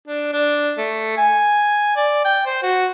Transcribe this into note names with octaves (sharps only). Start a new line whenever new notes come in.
D4
D4
A3
G#5
D5
G5
C5
F#4